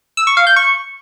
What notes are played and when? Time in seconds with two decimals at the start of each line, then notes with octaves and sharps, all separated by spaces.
0.17 E6
0.27 C#6
0.37 F5
0.47 G6
0.56 C#6